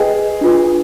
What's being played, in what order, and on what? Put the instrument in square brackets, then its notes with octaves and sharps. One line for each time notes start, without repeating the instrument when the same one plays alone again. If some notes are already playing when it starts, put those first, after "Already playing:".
Already playing: [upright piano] G#4 [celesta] B4 D#5 G5
[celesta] D4 F4 B4